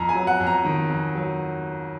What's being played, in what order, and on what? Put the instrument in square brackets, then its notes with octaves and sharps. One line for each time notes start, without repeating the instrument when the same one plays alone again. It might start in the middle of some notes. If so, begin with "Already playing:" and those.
Already playing: [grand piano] F2 A#5
G#5
F#3
F#5
F2
A#5
D#3
F2
F#3